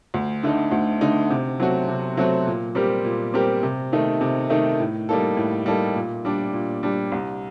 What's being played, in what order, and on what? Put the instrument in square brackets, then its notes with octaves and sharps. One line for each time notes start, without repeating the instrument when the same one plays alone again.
[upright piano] D2
D3 A3 D#4
D2
D3 A3 D#4
C3
F#3 A3 C4 F#4
C3
F#3 A3 C4 F#4
A#2
G3 C4 G4 A#4
A#2
G3 C4 G4 A#4
C3
D#3 A3 D#4
C3
D#3 A3 D#4
A2
G3 A#3 D#4 A4
A2
G3 A#3 D#4 A4
A#2
G3 D4
A#2
G3 D4
C2